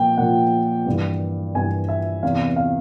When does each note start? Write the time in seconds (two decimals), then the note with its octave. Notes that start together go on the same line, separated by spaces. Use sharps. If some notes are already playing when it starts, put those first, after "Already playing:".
Already playing: A#2 F3 G5
0.17 A#2 F3 F#5
0.86 G2 E3
1.55 G2 E3 G#5
1.89 E5
2.23 E2 C3 E3 F5
2.56 F5